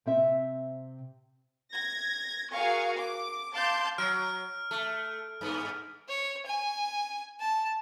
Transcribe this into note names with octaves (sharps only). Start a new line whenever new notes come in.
C3 C4 E5
G#6 A#6
F#4 G#4 A#4 F5 G#5 C#6
D6
F5 A5 C6 D6 G6
F#3 F6 D7
A3
G2 B3
C#5
G#5
A5